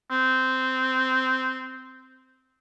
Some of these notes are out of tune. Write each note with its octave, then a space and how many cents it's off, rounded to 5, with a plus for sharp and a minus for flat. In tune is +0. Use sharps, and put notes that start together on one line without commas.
C4 -10